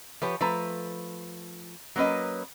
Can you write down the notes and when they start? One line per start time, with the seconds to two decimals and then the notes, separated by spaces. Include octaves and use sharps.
0.22 F3 G4 B4 C#5
0.41 F3 A3 B4 A#5
1.96 F#3 A#3 C#4 B4 D#5